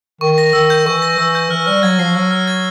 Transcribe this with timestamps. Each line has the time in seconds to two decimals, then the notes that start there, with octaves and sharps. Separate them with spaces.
0.21 D#3 C#6
0.38 A#6
0.53 D#3 E6
0.70 G6
0.86 E3 C#6
1.02 A#6
1.18 E3 E6
1.35 G6
1.50 E3 F6
1.66 G3 F6
1.83 F#3 G#6
1.98 F3 C7
2.15 F#3 F6
2.31 F6
2.48 G#6